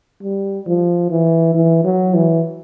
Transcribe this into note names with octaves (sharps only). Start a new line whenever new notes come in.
G3
F3
E3
E3
F#3
E3